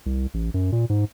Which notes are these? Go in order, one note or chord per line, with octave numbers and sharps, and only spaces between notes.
C2
A1
F#2
A#2
G#2